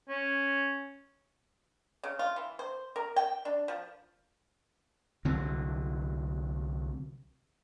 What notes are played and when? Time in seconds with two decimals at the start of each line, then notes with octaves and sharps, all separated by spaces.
0.09 C#4
2.04 C#3
2.19 F4
2.36 E3
2.59 C5
2.96 A#4
3.16 G5
3.45 D4
3.68 F3
5.25 C2 D3 F#3 C4